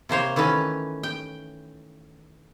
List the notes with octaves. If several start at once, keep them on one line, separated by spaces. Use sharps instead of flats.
C3 A#3 C5 C#5
D#3 E3 A3 C#4 B4
G5